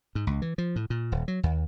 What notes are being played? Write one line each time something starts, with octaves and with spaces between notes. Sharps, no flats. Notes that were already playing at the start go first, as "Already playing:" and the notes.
G#2
C#2
E3
F3
A2
A#2
D#1
F#3
D#2